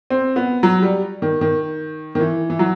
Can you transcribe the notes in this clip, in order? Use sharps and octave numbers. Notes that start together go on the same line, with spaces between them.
C4
B3
F#3
G3
D#3
D#3
D#3
E3
E3
F#3